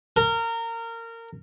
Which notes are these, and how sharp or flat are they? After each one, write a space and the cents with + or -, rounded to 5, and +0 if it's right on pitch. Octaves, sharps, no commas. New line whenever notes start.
A#4 -25